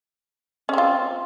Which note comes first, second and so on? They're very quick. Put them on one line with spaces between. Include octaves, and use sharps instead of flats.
C#4 C4 F4